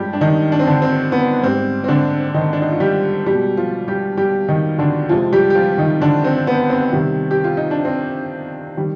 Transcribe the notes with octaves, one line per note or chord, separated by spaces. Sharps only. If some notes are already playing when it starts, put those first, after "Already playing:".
Already playing: G2 F3 G3 G#3 G4
D4
D#3 D#4
D4
C4
D3 D4
C4
B3
G#2 G3 C4
C4
D3 D4
D#3 D#4
D4
D#4
F4
G3 G4
B2 G3 G#3 G4
F3 F4
G3 G4
G3 G4
D#3 D#4
D3 D4
F2 C3 F3 G#3 F4
G3 G4
G4
F3 F4
D#3 D#4
D3 D4
C4
B3
C4
C3 D#3 G3
G4
F4
D#4
D4
C4
D#3 G3